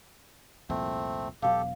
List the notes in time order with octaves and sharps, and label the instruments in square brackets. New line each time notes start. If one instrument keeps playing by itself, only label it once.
[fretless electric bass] C2 F2 A#2 [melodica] A3 C4
[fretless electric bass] E1 B2 F#3 [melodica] G4 A4 [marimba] F5